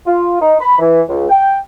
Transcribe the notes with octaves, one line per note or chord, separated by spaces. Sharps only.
F4
D#4
B5
E3
C#2
G5